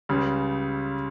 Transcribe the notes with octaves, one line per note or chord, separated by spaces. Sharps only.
C#2 C#3 G3